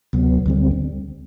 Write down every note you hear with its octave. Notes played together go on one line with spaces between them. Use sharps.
D2 C3 F#3 B3
D2 D3 G3 C4